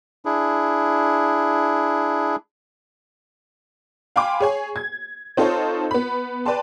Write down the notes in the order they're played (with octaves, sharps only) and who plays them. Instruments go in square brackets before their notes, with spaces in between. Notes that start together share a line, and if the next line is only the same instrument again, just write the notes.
[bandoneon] D4 E4 G#4
[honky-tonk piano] F5 G5 G#5 B5 C6 D6
G#4 C#5 G#5
G#6
C4 D#4 F4 A4 C5 C#5
B3 B5
B4 D5 G5 A5 C6